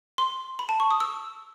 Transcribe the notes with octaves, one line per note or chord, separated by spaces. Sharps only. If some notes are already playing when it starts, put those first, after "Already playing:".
C6
B5
A5
C#6
D#6
E6